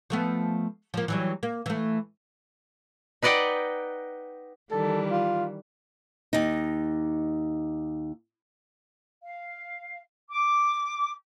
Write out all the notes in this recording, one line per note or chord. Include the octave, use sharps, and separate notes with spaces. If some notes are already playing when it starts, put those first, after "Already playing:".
F3 A3 B3
F3 A#3
E3 F#3 G3
A#3
E3 A3
D#4 B4 D5 D#5 F#5 G5
D#3 E3 G3 A4
F4
D#2 D#4
F5
D6